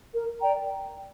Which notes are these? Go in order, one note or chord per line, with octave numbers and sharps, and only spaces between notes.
A#4
D5 G5 A#5